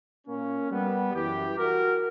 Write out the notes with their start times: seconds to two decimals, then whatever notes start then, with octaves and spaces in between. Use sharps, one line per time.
0.27 A#2 A#3 C#4
0.71 G3 B3
1.14 F#2 E3 E4 G4
1.57 F#4 A#4